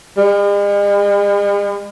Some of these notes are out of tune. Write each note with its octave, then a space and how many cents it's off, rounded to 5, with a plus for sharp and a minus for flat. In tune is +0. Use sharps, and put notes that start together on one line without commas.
G#3 -45